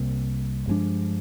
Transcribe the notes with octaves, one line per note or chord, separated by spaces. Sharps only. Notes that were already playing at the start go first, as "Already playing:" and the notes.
Already playing: C2 C3 G3 A#3
G2 F3 G#3 D4